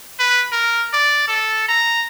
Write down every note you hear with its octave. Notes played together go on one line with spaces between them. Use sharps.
B4
A#4
D5
A4
A#5